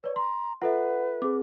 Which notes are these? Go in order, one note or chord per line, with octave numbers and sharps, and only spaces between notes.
B4 C#5 D5
A#5 C6
F4 A4 B4 E5 F#5
C4 G#4 D6